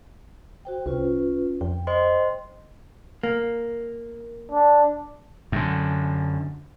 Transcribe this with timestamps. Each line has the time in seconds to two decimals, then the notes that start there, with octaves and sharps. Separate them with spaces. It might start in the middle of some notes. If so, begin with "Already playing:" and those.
0.65 F#4 C5 G5
0.86 C2 C#4 F4 B4
1.61 F2 G5
1.87 C5 D#5 C6
3.23 A#3
4.52 D4
5.52 F#2 D3